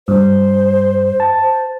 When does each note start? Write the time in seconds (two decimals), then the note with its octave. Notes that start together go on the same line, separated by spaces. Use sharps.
0.08 G2 C5
1.20 A5
1.40 C5